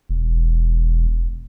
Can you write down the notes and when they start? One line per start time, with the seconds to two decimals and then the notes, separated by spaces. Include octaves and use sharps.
0.09 E1